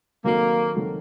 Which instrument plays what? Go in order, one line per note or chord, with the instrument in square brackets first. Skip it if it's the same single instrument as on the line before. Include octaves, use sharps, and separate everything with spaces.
[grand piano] D#3 F#3 C4 F#4 A4 [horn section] A#3
[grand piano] D#3 F#3 C4 F#4 A4